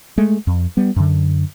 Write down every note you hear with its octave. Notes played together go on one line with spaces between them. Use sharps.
G#3 A3
F2
G3 B3
F#2 D3